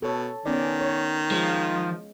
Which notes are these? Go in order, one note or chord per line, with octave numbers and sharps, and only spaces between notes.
B2 A4 C#5
D#3 B3 C#4 D5
C#5
F3 G#3